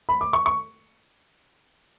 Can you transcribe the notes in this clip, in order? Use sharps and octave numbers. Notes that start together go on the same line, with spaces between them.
B5
D6
C#6
C#6